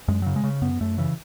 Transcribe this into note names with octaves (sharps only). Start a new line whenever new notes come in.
F#2 G#3
C#3 F#3
G#3
C#3
F#2 B3
F#2 A3
C#3 E3